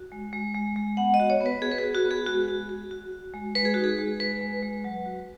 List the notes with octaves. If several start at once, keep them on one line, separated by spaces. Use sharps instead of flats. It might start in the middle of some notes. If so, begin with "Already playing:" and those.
Already playing: F#4
G#3
G#3
G#3
G#3
B3 F#5
D#5
F#4
C#5
B3
B4
F#4 G#4
B4
G#4
F#4
F#4
B3
G#4
G#3 F#4
F#4
F#4
F#4
F#4
G#3
G#3 B4
G#4
D#4 F#4
G#4
G#3
G#3 B4
G#3
G#3
F#3
F#4